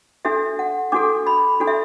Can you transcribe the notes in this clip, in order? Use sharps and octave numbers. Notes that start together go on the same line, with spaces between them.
D4 F#4 A4 E5
F#5
D4 F#4 A4 D6
B5
D4 F#4 A4
E5